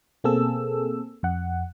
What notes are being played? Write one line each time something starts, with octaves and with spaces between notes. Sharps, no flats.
B2 A#3 C4 G#4 A4 E6
F2 F#5